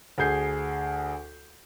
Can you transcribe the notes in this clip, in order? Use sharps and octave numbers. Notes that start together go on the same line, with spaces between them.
D2 G#4 G6 C7